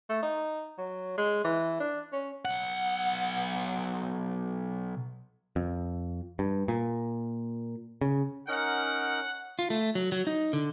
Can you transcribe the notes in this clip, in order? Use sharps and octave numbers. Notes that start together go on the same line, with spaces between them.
A3
D#4
F#3
G#3
E3
D4
C#4
B1 F#5
F2
G2
A#2
C#3
C#4 D#4 A#4 F#5
F4
A3
F#3
F#3
D#4
D3